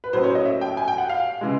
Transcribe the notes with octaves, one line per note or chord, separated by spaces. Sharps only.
B4
A2 F#3 A#3 C#4 C5
C#5
D#5
E5
G5
G#5
G5
F#5
F5
C#3 E3 G#3